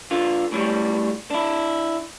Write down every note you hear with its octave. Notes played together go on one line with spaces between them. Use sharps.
D3 F4
A2 F#3 G3
D4 E4